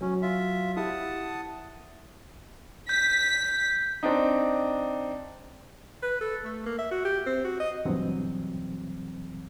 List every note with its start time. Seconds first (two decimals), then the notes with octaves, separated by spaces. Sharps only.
0.01 F#3 C#4
0.22 F4 E5
0.77 E4 G4 F#5 A5 D#6
2.89 G6 B6
4.03 C4 D4 D#4
6.03 B4
6.21 A4
6.45 A3
6.66 A#3
6.78 E5
6.91 F#4
7.05 G4
7.26 C4
7.45 F#4
7.60 D#5
7.85 D2 G2 B2 E3 F#3 C4